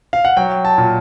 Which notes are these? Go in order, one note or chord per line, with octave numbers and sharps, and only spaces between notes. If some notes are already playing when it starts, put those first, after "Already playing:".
F5
F#5
F#3 G5
A5
A#2